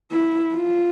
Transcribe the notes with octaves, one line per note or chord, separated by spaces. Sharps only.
E4
F4